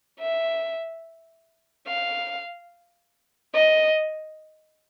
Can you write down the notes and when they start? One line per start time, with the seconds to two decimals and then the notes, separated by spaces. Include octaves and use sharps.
0.20 E5
1.87 F5
3.54 D#5